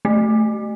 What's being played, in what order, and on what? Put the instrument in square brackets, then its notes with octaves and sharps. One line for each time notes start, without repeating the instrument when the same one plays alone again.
[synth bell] A3